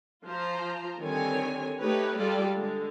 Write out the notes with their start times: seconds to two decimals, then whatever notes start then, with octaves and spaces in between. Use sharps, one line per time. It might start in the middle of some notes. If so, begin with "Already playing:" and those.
0.24 F3 F4 C5 A#5
1.00 D3 D#3 G3 C4 C#5 G#5
1.79 A3 D#4 G4 B4 C#5
2.18 G3 G#3 F4 A4 D5
2.55 D3 G#3